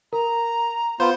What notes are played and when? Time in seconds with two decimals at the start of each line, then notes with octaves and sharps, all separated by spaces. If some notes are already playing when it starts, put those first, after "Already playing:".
0.13 A#4 A#5
1.00 B3 F4 C5 G6